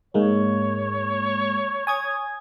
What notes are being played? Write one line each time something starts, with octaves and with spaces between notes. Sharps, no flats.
G#2 G#3 A#3 C#5
G#5 D#6 G#6